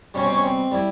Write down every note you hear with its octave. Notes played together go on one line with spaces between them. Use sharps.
B2 G3 C#4
C4
C#4
C4
G3 E4